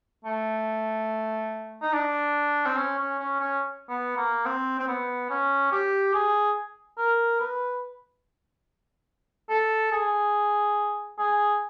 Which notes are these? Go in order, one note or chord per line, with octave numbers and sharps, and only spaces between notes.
A3
D#4
D4
C4
C#4
C#4
C#4
C#4
B3
A#3
C4
C4
B3
C#4
G4
G#4
A#4
B4
A4
G#4
G#4